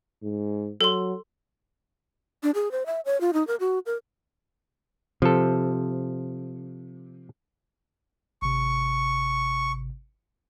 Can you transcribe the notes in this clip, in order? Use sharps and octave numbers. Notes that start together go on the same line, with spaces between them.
G#2
F#3 A4 C6
D4
G#4
C5
E5
C#5
F4
D#4
A#4
F#4
A#4
C3 F3 A4
G#1 C3 C#6